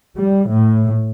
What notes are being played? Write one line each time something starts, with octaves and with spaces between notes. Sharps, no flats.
G3
A2